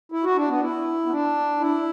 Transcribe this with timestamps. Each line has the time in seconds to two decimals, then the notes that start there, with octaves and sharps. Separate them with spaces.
0.12 E4
0.24 F#4
0.36 D4
0.48 B3
0.61 E4
1.06 B3
1.10 D4
1.60 E4